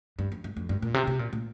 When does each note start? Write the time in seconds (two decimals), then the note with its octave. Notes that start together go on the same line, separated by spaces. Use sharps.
0.19 G2
0.32 F2
0.44 G2
0.57 F2
0.69 G2
0.82 A#2
0.94 C3
1.07 C3
1.19 A#2
1.33 A#2